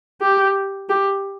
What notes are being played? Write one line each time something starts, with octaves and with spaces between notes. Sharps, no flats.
G4
G4